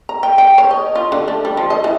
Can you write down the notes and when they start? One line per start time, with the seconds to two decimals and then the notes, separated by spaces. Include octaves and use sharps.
0.09 A#5
0.23 G5
0.38 G5
0.58 C#5
0.71 D#5
0.95 F4
1.12 D3
1.28 A3
1.45 G3
1.57 F3
1.70 D#5
1.84 E3